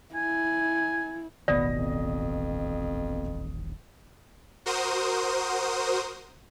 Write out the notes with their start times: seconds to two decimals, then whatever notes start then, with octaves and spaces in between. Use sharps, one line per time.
0.15 E4 G#5
1.48 D#1 A1 B2 D#3 B3 D5 D#6 A#6
1.73 F2
4.66 F#4 A#4 C5 D#6